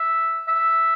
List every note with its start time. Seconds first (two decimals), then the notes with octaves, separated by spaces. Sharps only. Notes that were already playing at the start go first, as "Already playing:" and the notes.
Already playing: E5
0.48 E5